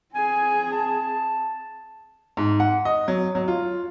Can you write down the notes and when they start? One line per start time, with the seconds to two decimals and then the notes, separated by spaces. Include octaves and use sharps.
0.15 C4 G#4 G#5
0.72 A5
2.37 G#2
2.60 F#5
2.85 D#5
3.08 F#3
3.35 F#3
3.48 F4